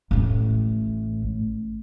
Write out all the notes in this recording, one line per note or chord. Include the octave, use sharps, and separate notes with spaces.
A1 A2